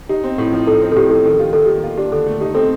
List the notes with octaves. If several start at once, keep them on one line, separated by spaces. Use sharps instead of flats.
D#4 G4
C4
A2
F3
D#4 A4
C4
A4
A2 G4
F3 A4
D#3 A4
F4 G4
D#3 A4
G4
A#3
F4 A4
D4 G4
D3 A4
A3
D#4 G4
C4 A4